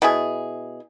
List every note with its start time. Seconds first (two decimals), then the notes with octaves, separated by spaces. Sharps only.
0.02 B2 E4 G#4